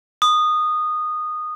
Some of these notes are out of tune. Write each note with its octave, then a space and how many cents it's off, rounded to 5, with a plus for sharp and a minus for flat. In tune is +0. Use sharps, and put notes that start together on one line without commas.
D#6 -15